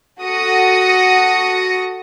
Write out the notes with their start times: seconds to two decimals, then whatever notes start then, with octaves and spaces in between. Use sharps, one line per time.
0.21 F#4 A4 D#6 A#6 C#7